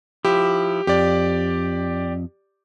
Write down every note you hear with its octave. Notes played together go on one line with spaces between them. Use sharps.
F3 E4 G4
F2 G4 D5